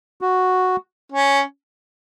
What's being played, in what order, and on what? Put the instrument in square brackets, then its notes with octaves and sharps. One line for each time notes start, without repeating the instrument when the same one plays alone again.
[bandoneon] F#4
[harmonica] C#4